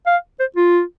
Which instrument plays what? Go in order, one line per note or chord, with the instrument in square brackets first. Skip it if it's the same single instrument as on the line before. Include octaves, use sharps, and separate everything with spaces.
[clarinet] F5
C5
F4